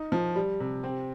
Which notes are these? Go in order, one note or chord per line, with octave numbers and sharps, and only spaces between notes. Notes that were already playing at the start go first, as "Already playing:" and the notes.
Already playing: D#4
F3
G3
C3
C4